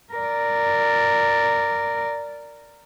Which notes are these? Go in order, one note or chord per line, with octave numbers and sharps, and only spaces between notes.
A#4 D5